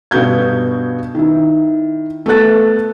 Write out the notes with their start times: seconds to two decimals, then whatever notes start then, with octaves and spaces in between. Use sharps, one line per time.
0.11 G2 B2 B3 F#4 G6 G#6
1.15 D#3 E4
2.26 A3 B3 A4 A5 F#6 A6